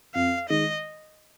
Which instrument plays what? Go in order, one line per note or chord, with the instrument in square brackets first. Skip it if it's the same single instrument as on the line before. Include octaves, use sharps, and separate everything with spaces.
[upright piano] F2 [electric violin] F5
[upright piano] D#3 G#3 [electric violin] D#5